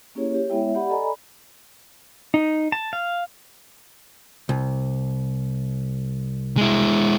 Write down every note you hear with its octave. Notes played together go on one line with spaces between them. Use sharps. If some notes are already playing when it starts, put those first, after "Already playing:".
A#3 C#4 E4 G4 G#4 C#5
G4 C#5
G#3 B3 E4 C#5 E5 G5
E5
G4 D5 F#5 B5
A4 D5 D#5 G#5 A#5 B5
D#4
A5
F5
C2
G#3 E4